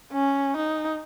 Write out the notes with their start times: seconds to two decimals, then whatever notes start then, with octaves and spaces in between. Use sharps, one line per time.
0.12 C#4
0.57 D#4